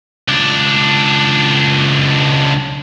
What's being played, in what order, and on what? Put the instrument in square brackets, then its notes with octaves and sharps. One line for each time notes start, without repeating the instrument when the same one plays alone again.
[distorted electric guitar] C#2 D4